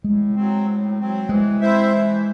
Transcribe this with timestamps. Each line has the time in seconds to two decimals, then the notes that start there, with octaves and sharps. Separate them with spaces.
0.04 A2 G#3
0.35 F#3 C4
0.67 A2
0.99 F#3 C4
1.29 E3 G#3
1.61 C4 E4 C5 E5
1.92 E3